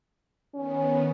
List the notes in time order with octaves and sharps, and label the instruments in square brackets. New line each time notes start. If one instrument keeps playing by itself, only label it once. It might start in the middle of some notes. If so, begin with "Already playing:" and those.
[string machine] D#3 B3 [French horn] C#4